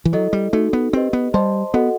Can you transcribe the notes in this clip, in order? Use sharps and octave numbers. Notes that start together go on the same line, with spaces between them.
E3
F#3 E4 A4 D#5
G3
A3 D#4 F#4 A4
B3
C4 G4 B4 D#5
B3
G3 C5 D#5 A5 C6
B3 F#4 A4 D#5 F#5